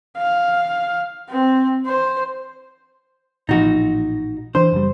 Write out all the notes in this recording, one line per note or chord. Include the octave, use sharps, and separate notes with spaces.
F5
C4
C5
A1 A#2 F3 D#4 F#4
E3 D4 C5
F#1 G3